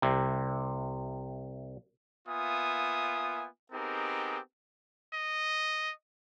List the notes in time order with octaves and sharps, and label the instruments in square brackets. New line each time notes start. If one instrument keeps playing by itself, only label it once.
[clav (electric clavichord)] C2 C3
[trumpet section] A#3 B3 F4 E5 G#5 D#6
B3 C4 D#4 G4 G#4 A#4
[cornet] D#5